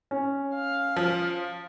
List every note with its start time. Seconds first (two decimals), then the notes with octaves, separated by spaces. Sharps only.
0.11 C#4
0.54 F5
0.96 F3